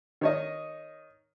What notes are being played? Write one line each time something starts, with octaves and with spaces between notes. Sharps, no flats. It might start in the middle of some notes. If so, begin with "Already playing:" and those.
D#3 C#5 D#5